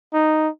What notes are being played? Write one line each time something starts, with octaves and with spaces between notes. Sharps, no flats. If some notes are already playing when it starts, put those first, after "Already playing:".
D#4